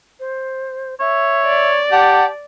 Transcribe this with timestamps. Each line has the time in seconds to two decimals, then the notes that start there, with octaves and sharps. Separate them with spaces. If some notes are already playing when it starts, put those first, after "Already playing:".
0.20 C5
1.00 C#5 E5
1.46 D5
1.92 G4 F#5 A5